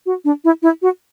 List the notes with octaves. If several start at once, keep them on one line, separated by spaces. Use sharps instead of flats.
F#4
D4
E4
E4
F#4